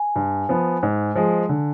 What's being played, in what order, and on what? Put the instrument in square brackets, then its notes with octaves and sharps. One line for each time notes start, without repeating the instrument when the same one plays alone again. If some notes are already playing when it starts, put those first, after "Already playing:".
Already playing: [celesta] G#5
[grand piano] G2
F3 B3
G#2
F3 G#3
D3